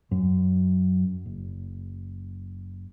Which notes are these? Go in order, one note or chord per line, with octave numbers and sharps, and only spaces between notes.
F#2
F#1